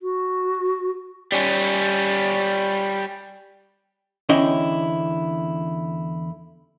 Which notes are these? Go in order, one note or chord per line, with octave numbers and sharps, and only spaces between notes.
F#4
G3 C#4
E2 D3 C#4 E4 D#5 G5